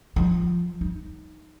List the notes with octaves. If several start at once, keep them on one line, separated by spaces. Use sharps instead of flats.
F3
D#4